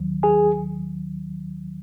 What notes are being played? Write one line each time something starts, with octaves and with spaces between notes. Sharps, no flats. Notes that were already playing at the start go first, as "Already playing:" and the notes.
Already playing: D#2 D#3 F#3
G#4 G#5